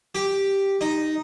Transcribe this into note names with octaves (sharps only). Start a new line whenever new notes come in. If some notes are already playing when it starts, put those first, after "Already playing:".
G4
D#4